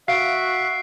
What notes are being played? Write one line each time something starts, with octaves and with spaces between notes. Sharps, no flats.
F#4 E5 F5 C7 D7